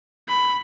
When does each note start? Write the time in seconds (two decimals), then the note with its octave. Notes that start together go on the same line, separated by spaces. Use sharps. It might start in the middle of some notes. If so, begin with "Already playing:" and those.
0.29 B5